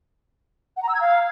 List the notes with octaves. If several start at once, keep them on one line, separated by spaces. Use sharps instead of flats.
F#5
A#5
E6
G#6
F5